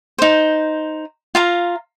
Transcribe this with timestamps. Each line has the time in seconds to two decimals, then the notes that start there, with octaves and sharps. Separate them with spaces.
0.18 D#4 C5
1.35 F4 F5 A#5